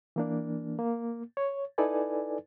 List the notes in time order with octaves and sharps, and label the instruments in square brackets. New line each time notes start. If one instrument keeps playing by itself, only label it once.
[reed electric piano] E3 A#3 D4
A#3
C#5
D#4 E4 A4 B4 D5 G#5